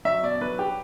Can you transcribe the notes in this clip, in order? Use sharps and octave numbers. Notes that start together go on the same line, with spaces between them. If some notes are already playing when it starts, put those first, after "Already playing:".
F#3 E5
B2 D5
F#3 B4
G4